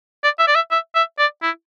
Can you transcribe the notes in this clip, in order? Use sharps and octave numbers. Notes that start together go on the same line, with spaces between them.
D5
E5
D5
E5
E5
E5
D5
E4